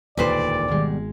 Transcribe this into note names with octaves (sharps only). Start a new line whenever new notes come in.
E1 D2 A#2 D#3 G4 B4 C5 D5
G#1 B2 D#3 G3 G#3